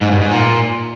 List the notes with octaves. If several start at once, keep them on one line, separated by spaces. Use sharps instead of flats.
G#2
G2
G#2
A#2